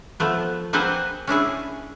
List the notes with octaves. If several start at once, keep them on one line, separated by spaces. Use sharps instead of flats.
F3 A3 B3
A#3 C4 G#4 B4 C5 F#5
C#4 D4 E4 G#4